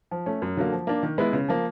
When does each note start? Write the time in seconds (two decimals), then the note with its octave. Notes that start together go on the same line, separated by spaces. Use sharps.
0.11 F3
0.26 A3 C#4
0.42 F#2
0.57 D3 F#3 A#3
0.72 F3
0.87 A#3 D4
1.03 D#3
1.18 G#3 B3 E4
1.33 C#3
1.48 F3 A#3